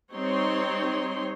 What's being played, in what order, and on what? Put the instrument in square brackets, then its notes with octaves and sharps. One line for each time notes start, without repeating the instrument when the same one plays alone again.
[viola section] G3 C4 D#4 C#5 C6